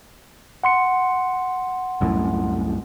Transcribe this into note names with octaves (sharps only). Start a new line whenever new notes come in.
F#5 C6 C#7
C2 F#2 A2